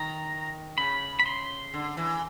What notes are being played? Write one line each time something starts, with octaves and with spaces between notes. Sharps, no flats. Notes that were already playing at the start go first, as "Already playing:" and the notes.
Already playing: D#3 A#5
C#3 B5
B5
C6
D3
E3